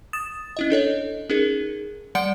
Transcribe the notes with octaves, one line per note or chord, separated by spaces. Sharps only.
D#6 A6 E7
C#4 E4 D#5
D4 A4 C#5 D#5
C#4 D#4 G#4 A#4
G3 D5 F#5 G6 C#7 D7